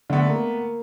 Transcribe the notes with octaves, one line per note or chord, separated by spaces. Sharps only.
D3 A3 B3
A#3